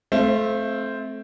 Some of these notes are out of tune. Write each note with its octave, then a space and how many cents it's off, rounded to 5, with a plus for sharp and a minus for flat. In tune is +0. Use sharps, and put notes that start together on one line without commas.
A3 -20 C4 +0 F5 -40